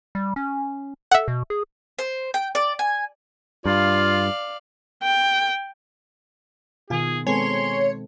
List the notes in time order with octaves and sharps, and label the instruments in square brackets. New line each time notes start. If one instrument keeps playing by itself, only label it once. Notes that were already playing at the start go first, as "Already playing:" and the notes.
[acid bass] G3
C#4
[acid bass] A4 [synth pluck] E5 F#5
[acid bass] B2
G#4
[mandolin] C5
G5
D5
G#5
[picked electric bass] G2 [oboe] F4 [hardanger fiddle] D5 F5
[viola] G5
[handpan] B2 D#3 [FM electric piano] F4 G#5 [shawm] G#4
[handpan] G#3 C4 A4 [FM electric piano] B3 G#5 [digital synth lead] C#5 [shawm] C6